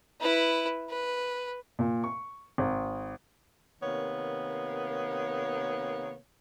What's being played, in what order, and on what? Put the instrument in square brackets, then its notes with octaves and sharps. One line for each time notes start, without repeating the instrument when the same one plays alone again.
[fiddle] E4 B4
B4
[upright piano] A#2
C#6
G#1
[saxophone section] C3 D#3 A#3 B3 C#5